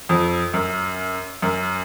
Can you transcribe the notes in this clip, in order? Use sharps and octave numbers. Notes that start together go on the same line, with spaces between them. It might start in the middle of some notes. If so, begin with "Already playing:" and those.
F2
F#2
F#2